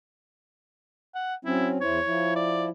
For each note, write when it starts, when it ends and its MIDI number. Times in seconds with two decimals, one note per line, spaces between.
1.14 1.35 78
1.45 1.78 54
1.45 1.78 60
1.45 1.78 61
1.45 1.71 64
1.81 1.99 40
1.81 1.99 64
1.81 1.99 72
1.81 2.33 73
2.06 2.69 53
2.06 2.69 64
2.36 2.66 74